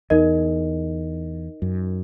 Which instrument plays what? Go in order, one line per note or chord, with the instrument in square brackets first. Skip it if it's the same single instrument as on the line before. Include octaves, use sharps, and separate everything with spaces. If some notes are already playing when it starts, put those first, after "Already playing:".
[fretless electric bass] E2 [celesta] D#4 A#4 D#5
[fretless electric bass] F#2